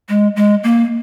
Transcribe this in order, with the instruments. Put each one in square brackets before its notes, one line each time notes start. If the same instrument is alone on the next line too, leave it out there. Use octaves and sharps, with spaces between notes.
[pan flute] G#3
G#3
A#3